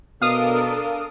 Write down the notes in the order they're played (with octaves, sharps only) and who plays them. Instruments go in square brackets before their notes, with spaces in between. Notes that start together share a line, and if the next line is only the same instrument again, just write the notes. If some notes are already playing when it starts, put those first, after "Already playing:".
[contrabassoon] B2 [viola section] D4 A4 A#4 [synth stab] F5 D#6